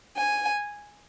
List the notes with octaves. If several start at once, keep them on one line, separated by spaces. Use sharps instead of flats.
G#5